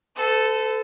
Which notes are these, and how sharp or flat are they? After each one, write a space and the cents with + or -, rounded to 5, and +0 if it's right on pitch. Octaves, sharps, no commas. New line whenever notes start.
A4 +0 C5 -45